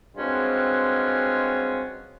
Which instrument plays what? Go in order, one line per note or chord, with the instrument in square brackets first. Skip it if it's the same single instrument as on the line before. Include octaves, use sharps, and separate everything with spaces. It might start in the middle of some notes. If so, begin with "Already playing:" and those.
[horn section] G2 G#3 C4 C#4 F4 F#4